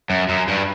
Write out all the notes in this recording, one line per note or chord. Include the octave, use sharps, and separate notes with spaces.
F#2
F#2
G2